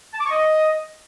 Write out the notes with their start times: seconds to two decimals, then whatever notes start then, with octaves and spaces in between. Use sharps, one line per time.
0.13 A5
0.19 D6
0.25 C#6
0.30 D#5